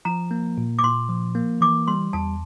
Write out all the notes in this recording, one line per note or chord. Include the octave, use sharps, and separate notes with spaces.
F3 A#5
A#3
A#2
D6
A#2 C6
F3
A#3
E3 D6
G3 C6
E2 A5